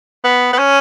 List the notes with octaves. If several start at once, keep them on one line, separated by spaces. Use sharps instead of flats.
B3
B3
C#4